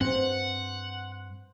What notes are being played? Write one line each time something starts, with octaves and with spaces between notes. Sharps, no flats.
G2 C4 C5 F#5